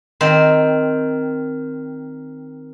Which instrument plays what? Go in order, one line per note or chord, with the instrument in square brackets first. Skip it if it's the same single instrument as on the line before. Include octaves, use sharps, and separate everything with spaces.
[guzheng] D#3 C4 C5